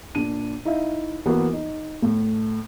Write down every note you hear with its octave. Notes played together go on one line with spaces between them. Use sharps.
A#2 D4 D#7
D#4 E4 E5 F5
E3 A#3 B3 F#4 A#4
D#4
A2 A3